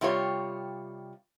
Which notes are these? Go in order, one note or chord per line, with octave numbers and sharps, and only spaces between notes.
C3 G3 F4 C#5